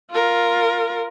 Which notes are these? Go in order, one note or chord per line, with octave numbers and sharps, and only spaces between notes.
F4 A#4